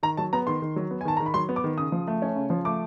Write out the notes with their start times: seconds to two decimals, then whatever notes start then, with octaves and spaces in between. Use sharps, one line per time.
0.03 D#3 A#5
0.17 F#3 A5
0.33 B3 A#5
0.47 D#3 C6
0.62 D#3
0.76 F#3
0.91 B3
1.01 G#5
1.05 D#3 A5
1.17 A#5
1.20 D#3
1.26 B5
1.34 F#3 C6
1.49 B3
1.56 D6
1.64 D#3
1.78 C#3 D#6
1.92 F3
2.07 A3
2.22 C#4
2.36 C#3
2.50 F3
2.65 A3 D6